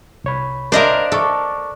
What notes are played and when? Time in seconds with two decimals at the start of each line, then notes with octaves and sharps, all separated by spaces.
0.24 C2 C#5 B5
0.72 D4 A#4 C5 D#5 F5
1.12 A4 A5 C#6 D6